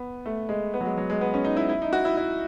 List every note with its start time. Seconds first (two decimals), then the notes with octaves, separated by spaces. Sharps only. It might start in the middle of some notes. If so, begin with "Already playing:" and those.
Already playing: B3
0.26 A3
0.49 G#3
0.74 B3
0.81 F#3
0.86 G#3
0.98 F#3
1.10 G#3
1.21 B3
1.34 C#4
1.45 D#4
1.57 E4
1.69 E4
1.82 D#4
1.93 F#4
2.05 E4
2.17 E4